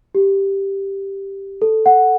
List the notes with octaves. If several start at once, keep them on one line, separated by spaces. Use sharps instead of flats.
G4
A4
F#5